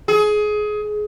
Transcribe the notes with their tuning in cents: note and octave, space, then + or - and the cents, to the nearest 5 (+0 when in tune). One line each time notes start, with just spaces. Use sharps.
G#4 +20